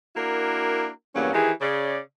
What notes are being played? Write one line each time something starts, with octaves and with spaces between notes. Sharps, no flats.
A#3 D4 E4 F#4 A#4
E2 G2 F#3 A#3 C#4
D#3 E3 E4 G4 G#4
C#3 D5